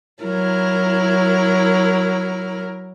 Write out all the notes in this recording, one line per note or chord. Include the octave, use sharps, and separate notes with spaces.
F#3 E4 A#4